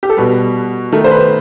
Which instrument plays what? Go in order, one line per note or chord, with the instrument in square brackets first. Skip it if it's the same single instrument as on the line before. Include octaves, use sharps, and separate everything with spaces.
[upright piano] G4
A4
B2 G3 B4
D#3 A3
C5
B4